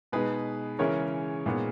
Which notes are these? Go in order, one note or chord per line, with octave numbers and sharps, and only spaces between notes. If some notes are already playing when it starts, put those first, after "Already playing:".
B2 G#3 D#4 G#4 B4
C#3 E3 G#3 C#4 A#4 C#5
A#2 G#3 B3 D#4